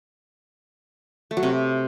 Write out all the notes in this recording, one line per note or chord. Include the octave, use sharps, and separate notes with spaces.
A3
F#3
C3